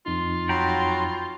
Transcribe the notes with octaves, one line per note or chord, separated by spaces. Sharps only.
F2 D#4 F4
F#3 F#4 G5 A#5 B5